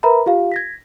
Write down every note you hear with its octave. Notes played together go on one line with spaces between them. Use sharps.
A#4 B4 E5 A#5 B5
F4 G4 F5
G#6 A#6 B6